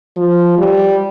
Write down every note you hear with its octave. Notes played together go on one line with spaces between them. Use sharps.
F3
G3